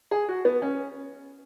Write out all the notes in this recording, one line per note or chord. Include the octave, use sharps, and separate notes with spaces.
G#4
F#4
B3
C#4